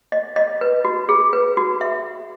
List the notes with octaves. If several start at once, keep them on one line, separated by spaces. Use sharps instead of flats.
D#5
D#5
B4
F#4
G#4
B4
F#4
E5